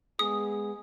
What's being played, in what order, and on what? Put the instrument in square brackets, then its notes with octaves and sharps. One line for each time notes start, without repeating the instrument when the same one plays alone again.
[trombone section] G#3 B3 G#4 [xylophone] D#6